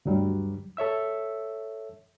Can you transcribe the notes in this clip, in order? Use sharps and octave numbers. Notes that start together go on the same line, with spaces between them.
D2 G2 F#3 G3
A4 C#5 E5 E6